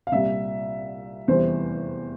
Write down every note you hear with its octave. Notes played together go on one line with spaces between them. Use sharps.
F5
C2 A#2 G3 E5
F1 E2 E3 G3 C4 C5